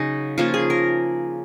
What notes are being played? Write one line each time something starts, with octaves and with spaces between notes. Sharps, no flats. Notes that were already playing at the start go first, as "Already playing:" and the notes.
Already playing: C#3 F#3 C#4 D#4
F3 A#3 C#4 F4
G#4
A#4